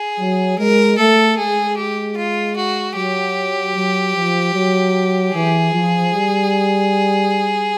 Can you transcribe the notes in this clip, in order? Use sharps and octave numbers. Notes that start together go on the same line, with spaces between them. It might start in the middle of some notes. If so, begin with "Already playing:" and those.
Already playing: G#4
F#3
G#3 A#4
A3 A4
G#3 G#4
G4
F4
F#4
F#3 G4
F#3
F3
F#3
E3 G#4
F3
G3